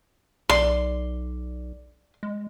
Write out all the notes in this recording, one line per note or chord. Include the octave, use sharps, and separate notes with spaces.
B1 D5 C6
G#3